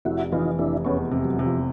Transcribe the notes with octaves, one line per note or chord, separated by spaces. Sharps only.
F1 E4 F#4
E3 D#4 F4
F1 D4 E4
E2 B3 C#4
C3
F#3
C3
F3